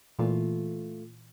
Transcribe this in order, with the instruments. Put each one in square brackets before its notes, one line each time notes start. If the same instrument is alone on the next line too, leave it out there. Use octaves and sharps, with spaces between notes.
[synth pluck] A#2 E3 [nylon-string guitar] A3 F4